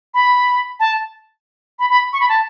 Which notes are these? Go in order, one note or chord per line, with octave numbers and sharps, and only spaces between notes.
B5
A5
B5
B5
C#6
B5
A5